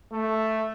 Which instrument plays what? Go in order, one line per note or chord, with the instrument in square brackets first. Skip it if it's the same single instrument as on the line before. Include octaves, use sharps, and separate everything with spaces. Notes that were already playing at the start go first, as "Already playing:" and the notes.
[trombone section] A3